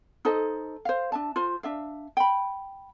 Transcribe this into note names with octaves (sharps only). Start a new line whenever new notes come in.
D#4 A4 C5 D#5
C5 F5
D4 E5 A5
F4 C5
D4 E5 F5
G5 B5